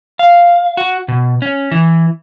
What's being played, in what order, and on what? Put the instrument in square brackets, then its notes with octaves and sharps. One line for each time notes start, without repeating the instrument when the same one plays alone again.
[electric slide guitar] F5
F#4
B2
C#4
E3